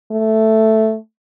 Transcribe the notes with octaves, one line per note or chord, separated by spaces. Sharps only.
A3